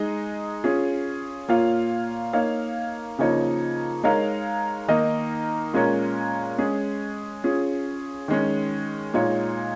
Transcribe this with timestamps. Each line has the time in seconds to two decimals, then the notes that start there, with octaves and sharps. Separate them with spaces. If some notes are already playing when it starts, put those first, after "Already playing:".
Already playing: G#3 D#4 G#4 D#5
0.64 C#4 F4 G#4
1.49 A#2 A#3 F4 C#5 F5
2.33 A#3 D#4 C#5 F5
3.19 C#3 F3 A#3 D#4 C#5
4.04 G#3 D#4 A#4 C#5 F5
4.88 D#3 A#3 D#4 A#4 D#5
5.73 A#2 G#3 C#4 A#4 C#5
6.58 G#3 C#4 G#4
7.44 C#4 F4 G#4
8.28 D#3 G#3 C#4
9.14 A#2 G#3 D#4 C#5